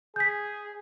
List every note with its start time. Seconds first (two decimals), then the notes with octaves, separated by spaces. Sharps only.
0.16 G#4 G6 B6